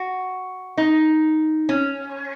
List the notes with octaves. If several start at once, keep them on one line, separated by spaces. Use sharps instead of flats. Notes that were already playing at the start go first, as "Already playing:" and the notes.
Already playing: F#4
D#4
C#4